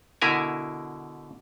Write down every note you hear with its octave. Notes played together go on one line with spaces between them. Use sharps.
B2 D3 E4 A#4 G#5